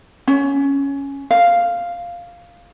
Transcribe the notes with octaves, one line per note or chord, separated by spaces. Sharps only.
C#4
F5